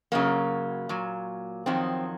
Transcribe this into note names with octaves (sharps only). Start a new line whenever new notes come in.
F#2 C#3 F#3 A#3
A#2 F#3
F2 D#3 F#3 C4